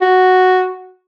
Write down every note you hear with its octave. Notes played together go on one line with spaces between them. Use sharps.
F#4